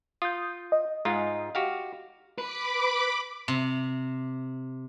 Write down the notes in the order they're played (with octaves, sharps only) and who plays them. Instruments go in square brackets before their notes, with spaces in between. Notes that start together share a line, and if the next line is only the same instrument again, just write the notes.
[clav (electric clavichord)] F4 [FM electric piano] D#6 G6
[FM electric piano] D#5
[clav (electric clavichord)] G#2 G#3 F4
F#4 G4 F5
[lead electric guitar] B4 [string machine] B5 D6
[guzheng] C3